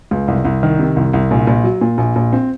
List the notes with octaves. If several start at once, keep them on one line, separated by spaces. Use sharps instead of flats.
C#2
C2
C2
D#3
C3
C2
C2
A#1
A#1
F#3
A#2
A#1
A#1
C4